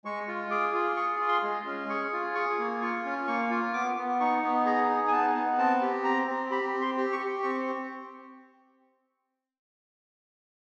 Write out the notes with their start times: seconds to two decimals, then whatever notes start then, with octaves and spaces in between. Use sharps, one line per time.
0.05 G#3 C#6
0.28 F4
0.51 G#4 D6
0.74 F4
0.97 G#4 C#6
1.20 F4
1.28 C6
1.43 G#3
1.66 C#4
1.89 G#4 C#6
2.13 F4
2.35 G#4 C#6
2.59 A#3
2.82 F4 C#6
3.05 C#4
3.27 A#3 C#6
3.50 F4
3.73 B3 D6
3.97 B3
4.20 D#4 C#6
4.43 B3
4.65 G#4 A#5
4.89 D#4
5.08 G#5
5.12 B3 A5
5.35 B3
5.58 C4 A5
5.82 G4
6.04 C4 A#5
6.27 C4
6.51 G4 B5
6.74 C4
6.81 C6
6.97 G4
7.13 C#6
7.19 G4
7.43 C4 C#6